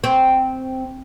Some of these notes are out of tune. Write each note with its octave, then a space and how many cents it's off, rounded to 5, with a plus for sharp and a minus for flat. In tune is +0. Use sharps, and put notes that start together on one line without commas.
C4 -5